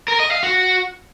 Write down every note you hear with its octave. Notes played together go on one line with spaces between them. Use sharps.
A#4
D#5
F5
F#4